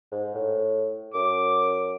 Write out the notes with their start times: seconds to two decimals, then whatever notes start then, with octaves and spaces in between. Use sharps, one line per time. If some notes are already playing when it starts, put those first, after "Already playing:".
0.12 G#2
0.35 A2
1.14 F#2 D6